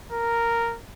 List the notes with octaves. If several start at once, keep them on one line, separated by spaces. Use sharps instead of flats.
A#4